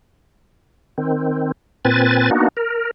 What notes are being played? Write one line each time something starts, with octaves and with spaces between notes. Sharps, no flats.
D#3 C4
A#2 C4 B4 G#5 A6
A#3 B3 D4 D#4 F#4
A#4